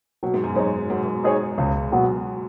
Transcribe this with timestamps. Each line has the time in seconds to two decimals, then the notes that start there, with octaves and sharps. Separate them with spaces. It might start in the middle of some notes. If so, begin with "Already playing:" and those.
0.23 B2 F#3
0.34 G#2
0.44 F#2
0.55 G#2 D#4 G#4 C#5
0.90 G#2 F#3
0.97 B2
1.05 G#2
1.24 D#4 G#4 C#5
1.58 C#2
1.92 B2 F#3 B3 F#4